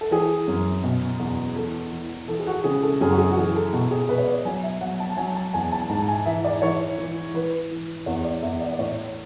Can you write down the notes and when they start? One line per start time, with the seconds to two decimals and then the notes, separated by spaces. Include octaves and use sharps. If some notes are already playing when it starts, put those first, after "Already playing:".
0.01 A4
0.11 E3 G#4
0.48 F#2
0.84 B2
1.19 E2
1.56 E3 A4
1.92 E3
2.28 E3 A4
2.40 G#4
2.47 F#4
2.64 C#3 G#4
2.83 A4
3.01 F#2 G#4
3.11 F#4
3.18 G#4
3.31 F#4
3.37 E3 G#4
3.55 A4
3.73 B2 F#4
3.91 G#4
4.09 B2 B4
4.18 C#5
4.27 D5
4.45 F#3 G#5
4.63 E5
4.81 F#3 F#5
5.00 A5
5.12 A5
5.17 F#3 G#5
5.35 A5
5.53 E2 G#5
5.72 A5
5.89 G#2 A5
6.08 G#5
6.26 E3 E5
6.44 D5
6.62 E3 C#5
6.98 E3
7.34 E3 B4
7.71 E3
8.06 E2 C#5
8.24 D5
8.43 E2 E5
8.61 D5
8.72 D5
8.79 A2 C#5